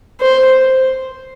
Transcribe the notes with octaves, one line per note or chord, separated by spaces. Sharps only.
C5